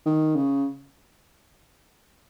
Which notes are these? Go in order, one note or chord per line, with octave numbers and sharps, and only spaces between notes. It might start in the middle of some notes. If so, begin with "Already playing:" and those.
D#3
C#3